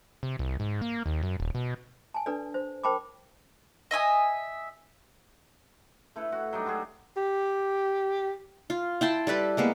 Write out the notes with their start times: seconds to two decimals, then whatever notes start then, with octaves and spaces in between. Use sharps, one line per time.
0.23 C3
0.39 C2
0.60 G#2
0.82 A#3
1.06 D#2
1.23 F#2
1.40 D#1
1.55 B2
2.14 G#5 A5
2.26 D4 A4 B4 D5
2.54 C5
2.84 A#4 C5 G5 A5 B5 D6
3.91 D#5 E5 G#5 D#6
6.16 A3 E4 A4 B4
6.32 F#4
6.53 F#3 G3 D4 D#4
6.66 G3 G#3 F#4 G#4
7.17 G4
8.70 F4
9.01 E4 G5 A5 C6
9.27 G3 A4 B4 D5
9.57 G#3 A#3 B3